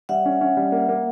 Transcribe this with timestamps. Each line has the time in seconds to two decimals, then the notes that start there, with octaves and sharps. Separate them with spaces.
0.09 G3 E5 F#5
0.26 C#4
0.41 C#4
0.57 G3
0.72 A#3
0.89 A#3